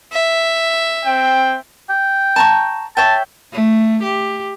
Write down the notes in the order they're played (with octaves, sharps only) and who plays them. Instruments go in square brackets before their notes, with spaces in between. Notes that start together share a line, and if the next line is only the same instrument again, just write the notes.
[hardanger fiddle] E5
[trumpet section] C4 G5
[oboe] G5
[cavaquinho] A5 A#5 C#6
[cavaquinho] C#5 E5 G5 [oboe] A5
[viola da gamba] A3
G4